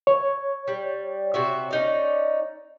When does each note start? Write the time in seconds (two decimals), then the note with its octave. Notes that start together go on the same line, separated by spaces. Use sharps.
0.07 C#5
0.68 G3
1.34 C3 F#4 E5
1.71 C#4 D#4 D5